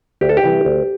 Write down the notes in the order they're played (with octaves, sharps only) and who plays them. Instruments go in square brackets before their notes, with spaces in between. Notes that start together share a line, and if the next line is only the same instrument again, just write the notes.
[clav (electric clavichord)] D2 G4
A4
G4
C3 E3 G3
D2